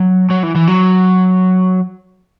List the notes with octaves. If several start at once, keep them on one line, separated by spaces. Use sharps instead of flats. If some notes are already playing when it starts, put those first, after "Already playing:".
Already playing: F#3
F#3
E3
E3
F#3